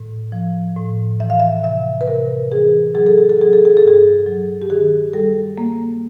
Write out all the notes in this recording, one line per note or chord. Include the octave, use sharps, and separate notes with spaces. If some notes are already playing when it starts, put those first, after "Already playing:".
Already playing: A2
F3
A2
E3 E5
F5
E5
C3 E5
B4
C3 A#4
E3 G#4
F#3 G#4
A4
G#4
A4
F#3 G#4
A4
G#4
A4
G2
G#4
F#3
G4
D#3 G#4
G3 A4
A#3